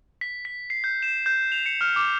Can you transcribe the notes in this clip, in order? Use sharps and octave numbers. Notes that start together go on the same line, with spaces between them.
B6
B6
C7
G6
E7
G6
F7
C#7
F6
D6